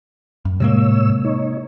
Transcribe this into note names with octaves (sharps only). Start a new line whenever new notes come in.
F#2
A2 C3 G#3 A#3 C#5 E6
D#4 C#5